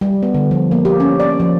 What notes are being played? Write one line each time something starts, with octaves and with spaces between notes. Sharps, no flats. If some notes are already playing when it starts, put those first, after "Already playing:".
G3
B3
D3
F3
A#3
G4
C#4
D5
F3